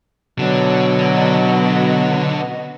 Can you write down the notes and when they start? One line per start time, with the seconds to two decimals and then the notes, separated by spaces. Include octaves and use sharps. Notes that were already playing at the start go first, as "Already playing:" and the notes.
0.39 B2 D3 F#3 D4
0.98 B3 F#4 D#5